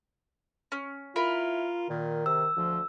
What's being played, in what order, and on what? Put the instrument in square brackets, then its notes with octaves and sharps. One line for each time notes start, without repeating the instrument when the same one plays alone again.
[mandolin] C#4
[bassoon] E4 [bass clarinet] F4 [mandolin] A#4 B5
[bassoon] A#2 [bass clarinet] D#3
[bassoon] C3 [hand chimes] E6
[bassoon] D2 [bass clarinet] F3